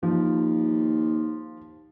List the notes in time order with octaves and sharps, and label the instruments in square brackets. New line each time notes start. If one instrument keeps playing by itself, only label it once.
[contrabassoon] D#2 [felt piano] F3